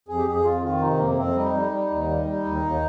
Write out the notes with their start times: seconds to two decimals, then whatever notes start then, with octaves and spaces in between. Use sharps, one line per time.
0.08 F2 G#4
0.17 G4
0.26 F2 G#4
0.45 F2 F4
0.63 D#3 F4
0.81 C3 D#4
0.99 F2 A#3
1.10 A#3
1.17 F2 C4
1.35 G3 D#4
1.54 G3
1.72 G3
1.90 D#2
2.08 G3
2.26 G3
2.45 D#2
2.62 D#2